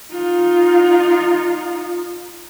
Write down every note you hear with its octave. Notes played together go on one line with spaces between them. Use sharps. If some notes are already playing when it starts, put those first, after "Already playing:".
D#4 F4